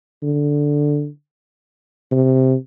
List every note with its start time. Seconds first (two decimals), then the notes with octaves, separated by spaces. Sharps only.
0.23 D3
2.12 C3